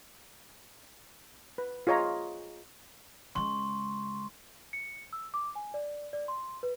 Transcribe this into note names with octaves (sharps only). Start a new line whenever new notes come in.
B4
F4 G#4 C#5 D#5 A#5
C#3 G#3 C6 C#6
C#7
E6
D6
G#5
D5
D5
C6
B4